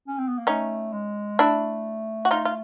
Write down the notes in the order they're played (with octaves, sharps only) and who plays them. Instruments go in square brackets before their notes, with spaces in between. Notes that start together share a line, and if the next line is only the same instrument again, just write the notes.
[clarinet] C#4
C4
B3
A#3
[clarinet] A3 [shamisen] C#4 D#4
[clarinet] G#3
[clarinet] A3 [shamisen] D4 E4
[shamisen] F#4
D#4 F4
F4